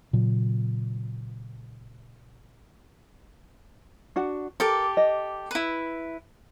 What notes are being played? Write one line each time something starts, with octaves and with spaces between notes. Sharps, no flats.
A#2 C#3 F#3
D4 F#4 F#5
G4 A4 A#4 D6
D#5
E4 B4